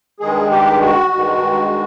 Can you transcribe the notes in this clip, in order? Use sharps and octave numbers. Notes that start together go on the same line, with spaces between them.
G2 D#3 G#3 G#4
G4
F#4
G2 D#3 G#3